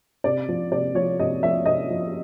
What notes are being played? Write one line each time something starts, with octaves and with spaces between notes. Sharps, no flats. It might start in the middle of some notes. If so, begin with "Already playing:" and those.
C3 D5
F3
C3 D5
F3 C#5
C3 D#5
F3 E5
C3 D#5
F3